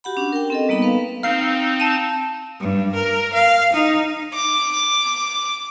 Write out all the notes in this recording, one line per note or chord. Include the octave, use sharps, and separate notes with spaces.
F#4 G4 F#5 B5
C#4 D4
A#4 G5
C4 A4 D#5
G3 A#3 B3 D#4 B5
B4 F5
C4 D#4 F5 F6 C7
A5 D#7
G2
A#4
F5
D#4
D6